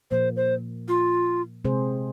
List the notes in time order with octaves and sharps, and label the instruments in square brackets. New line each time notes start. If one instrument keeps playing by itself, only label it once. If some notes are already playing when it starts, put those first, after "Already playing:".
[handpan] A#2 F3 A#3 [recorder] C5
[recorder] C5
F4
[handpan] C3 G#3 C4 G#4 C5